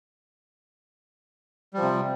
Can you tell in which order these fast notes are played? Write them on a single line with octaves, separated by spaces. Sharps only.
G3 F3 C3